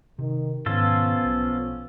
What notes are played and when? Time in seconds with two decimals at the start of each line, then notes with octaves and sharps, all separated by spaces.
0.19 C3 D#3
0.66 G#2 B2 D#3 F3 B3 C#4 F4 A4
1.25 B1